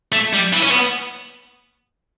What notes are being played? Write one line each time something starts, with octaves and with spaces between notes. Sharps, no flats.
A3
G3
E3
C#4
B3